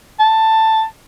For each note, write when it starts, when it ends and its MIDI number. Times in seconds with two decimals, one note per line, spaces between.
0.19 0.84 81